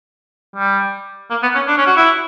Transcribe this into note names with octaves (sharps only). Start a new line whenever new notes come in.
G3
A#3
B3
C#4
D4
C#4
F#4
E4